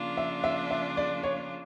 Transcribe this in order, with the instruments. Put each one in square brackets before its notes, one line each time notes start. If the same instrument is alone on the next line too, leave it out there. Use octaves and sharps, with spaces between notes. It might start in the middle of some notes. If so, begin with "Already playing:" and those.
Already playing: [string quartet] C#3 F3 A#3 D4 F4
[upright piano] E5
E5
E5
D5
C#5